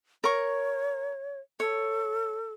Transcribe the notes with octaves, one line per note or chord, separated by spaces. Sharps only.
A#4 C#5 C#6
A4 C#5